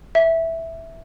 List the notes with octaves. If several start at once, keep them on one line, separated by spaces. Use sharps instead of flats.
E5